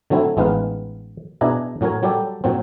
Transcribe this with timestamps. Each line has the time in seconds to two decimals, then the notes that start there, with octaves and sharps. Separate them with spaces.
0.10 D3 F#3 A3 C4 E4
0.37 A1 G#3 B3 D#4 B4 F5
1.41 B2 D4 E4 G#4 E5 A#5
1.81 A2 F#3 C#4 A#4 G#5
2.03 F#3 G3 G4 A4
2.44 A#2 F#3 C4